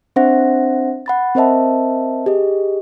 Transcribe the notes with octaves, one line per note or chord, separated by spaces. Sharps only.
C4 D4 C5 E5 F#5 A#6
F#5 B5 A6
C4 A#4 C5 D#5 E5 A5
G4 G#4 D#5